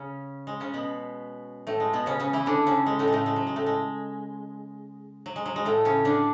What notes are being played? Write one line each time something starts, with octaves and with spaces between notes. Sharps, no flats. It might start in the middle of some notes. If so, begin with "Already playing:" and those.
Already playing: C#3 C#4
G#3
C#3 C#4
B2 B3
A2 A3
G#3
B2 B3
C#3 C#4
C#3 C#4
E3 E4
D3 D4
C#3 C#4
G#3
A2 A3
G#3
A2 A3
G#3
F#3
G#3
A2 A3
G#3
F#3
G#3
F#3
G#3
A2 A3
C#3 C#4
D3 D4